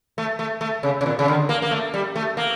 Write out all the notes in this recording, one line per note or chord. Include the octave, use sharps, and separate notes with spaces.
A3
A3
A3
C#3
C#3
A#2
C#3
D3
A#3
A#3
A3
G3
A3
A#3